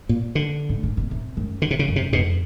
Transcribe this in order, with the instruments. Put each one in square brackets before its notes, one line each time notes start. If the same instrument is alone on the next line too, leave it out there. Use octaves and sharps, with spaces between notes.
[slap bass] A#2
D3
[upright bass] A2
A#2
B2
C3
F#2
[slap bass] D3
C3
C#3
[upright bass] F#2
[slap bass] C3
[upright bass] F2 [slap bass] B2